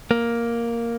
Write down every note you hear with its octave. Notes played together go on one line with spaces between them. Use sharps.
A#3